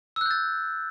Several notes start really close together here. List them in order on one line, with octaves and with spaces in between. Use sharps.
E6 F#6 G6 A6